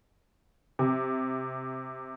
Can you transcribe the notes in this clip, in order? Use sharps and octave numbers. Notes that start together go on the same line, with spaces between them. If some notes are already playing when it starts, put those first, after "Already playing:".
C3